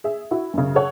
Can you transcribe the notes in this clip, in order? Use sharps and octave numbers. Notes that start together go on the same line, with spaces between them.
G#4 E5
E4 F#4
F#2 C#3
G#4 A4 C#5 F#5